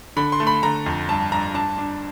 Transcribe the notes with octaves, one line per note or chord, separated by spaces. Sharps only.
D3 B5
C6
A3
B5
D3 A#5
F2
G2 A5
G2 A#5
D4 A5
D4